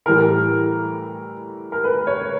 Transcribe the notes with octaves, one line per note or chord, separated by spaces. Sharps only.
A2 E3 G3 A#4
A#4
B4
C#5